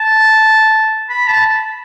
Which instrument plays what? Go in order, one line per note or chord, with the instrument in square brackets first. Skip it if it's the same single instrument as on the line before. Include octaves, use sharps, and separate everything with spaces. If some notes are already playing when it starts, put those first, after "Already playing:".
Already playing: [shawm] A5
B5
A5